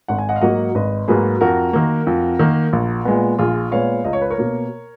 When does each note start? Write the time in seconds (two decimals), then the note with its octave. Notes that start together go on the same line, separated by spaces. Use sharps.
0.08 G#1 F#5
0.18 G#5
0.29 D#5 F#5
0.36 F5
0.41 G#2 F#3 A#3 D#5 F#5
0.75 G#1 B4 D#5
1.08 G#2 F#3 A#3 G#4 B4
1.41 F2 F#4 A#4
1.73 D#3 A#3
2.07 F2
2.39 D#3 A#3
2.73 A#1
3.05 A#2 G#3 B3
3.38 A#1 F4 G#4
3.72 A#2 G#3 B3 C#5 F5
4.04 C#2 D#5
4.13 C#5
4.22 B4
4.30 A#4 C#5
4.38 B2 A#3